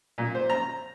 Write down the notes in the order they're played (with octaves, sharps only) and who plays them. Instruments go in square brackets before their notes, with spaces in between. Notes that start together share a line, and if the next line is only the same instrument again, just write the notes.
[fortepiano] A#2
C5
A#5